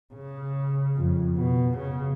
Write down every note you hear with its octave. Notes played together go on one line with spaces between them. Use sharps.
C#3
F2
B2
C#3